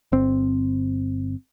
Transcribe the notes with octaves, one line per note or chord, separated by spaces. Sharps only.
G1 C4